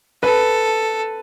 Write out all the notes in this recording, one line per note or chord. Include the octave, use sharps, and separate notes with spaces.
A4 B4